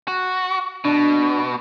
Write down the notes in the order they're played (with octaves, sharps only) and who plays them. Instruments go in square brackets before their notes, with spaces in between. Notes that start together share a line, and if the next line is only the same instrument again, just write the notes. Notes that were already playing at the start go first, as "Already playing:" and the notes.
[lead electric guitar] F#4
[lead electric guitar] B2 [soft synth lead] D4